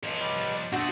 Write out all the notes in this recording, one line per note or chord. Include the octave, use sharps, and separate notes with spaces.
F3 D4 C#5 D#5
G3
B2 A3 C4 D4 F#4 A4 D#5